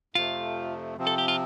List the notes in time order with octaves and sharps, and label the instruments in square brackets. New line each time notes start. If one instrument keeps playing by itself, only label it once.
[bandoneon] F2 C3 F3 A3 [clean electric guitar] F4
[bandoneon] C3 F3 C4
[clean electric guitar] A4
G4
F4